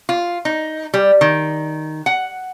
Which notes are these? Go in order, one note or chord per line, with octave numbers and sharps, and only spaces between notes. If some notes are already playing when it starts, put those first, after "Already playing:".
F4
D#4
G3
D#3
F#5